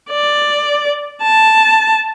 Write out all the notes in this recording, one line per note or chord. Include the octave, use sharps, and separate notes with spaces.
D5
A5